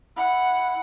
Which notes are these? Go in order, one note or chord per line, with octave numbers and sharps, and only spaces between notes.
E4 F#5